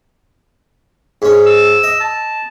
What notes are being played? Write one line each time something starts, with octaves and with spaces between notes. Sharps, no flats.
G#2 C#4
E6
D#5
A5